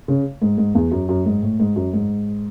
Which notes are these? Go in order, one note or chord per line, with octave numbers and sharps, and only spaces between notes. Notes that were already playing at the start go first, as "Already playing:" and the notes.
C#3
G#2
G#2
E2
F#2
F#2
G#2
A2
G#2
F#2
G#2